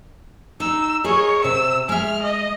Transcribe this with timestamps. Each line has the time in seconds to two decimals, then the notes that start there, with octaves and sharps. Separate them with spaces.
0.60 D#4 E6
1.04 G#4 A#4 C#5 D#5
1.44 C3 E6
1.89 G#3 E5 F6
2.23 D#5